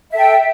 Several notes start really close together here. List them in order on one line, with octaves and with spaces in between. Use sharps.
E5 A4 G5